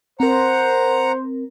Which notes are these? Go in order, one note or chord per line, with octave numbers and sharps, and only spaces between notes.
C4 A#4 C5 F#5 A#5